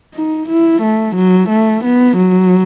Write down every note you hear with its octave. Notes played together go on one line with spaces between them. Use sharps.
D#4
E4
A3
F#3
A3
B3
F#3